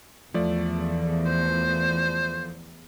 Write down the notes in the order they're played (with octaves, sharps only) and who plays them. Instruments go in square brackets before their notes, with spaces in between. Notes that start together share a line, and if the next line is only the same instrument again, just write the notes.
[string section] E2 [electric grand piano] F3 A3 D5
[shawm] C5